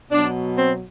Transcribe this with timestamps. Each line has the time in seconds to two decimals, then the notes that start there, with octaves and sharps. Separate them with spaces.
0.12 B2 F#3 D4
0.56 C4